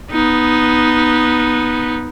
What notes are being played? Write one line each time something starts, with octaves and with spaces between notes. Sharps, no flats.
B3 D#4